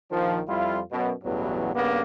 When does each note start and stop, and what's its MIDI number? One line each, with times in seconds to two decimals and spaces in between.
0.11 0.39 34
0.11 0.39 51
0.11 0.39 53
0.48 0.79 41
0.48 0.79 55
0.48 0.79 64
0.48 0.79 65
0.92 1.12 42
0.92 1.12 47
1.24 1.73 33
1.24 1.73 40
1.24 1.73 43
1.24 1.73 47
1.24 1.73 54
1.74 2.02 43
1.74 2.02 49
1.74 2.02 58
1.74 2.02 59